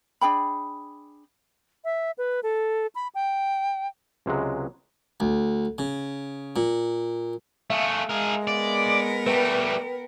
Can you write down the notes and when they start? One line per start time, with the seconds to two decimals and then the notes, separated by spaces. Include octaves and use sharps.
0.21 D4 G#4 G5 B5
1.85 E5
2.18 B4
2.43 A4
2.95 B5
3.15 G5
4.26 C#2 C3 F#3 G#3
5.20 D2
5.78 C#3
6.56 A#2
7.70 A3 G#4 E5 F5
8.09 G#3 G#4 A#4
8.47 B3 A#4 D5
9.27 G3 A3 B4 G5